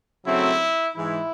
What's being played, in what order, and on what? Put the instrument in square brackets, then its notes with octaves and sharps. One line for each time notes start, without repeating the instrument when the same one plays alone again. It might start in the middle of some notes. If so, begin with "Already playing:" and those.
[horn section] C#3 F#3 A3 C4 E4
G#2 E3 G#3 E4